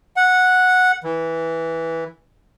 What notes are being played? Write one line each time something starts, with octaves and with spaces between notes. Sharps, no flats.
F#5
E3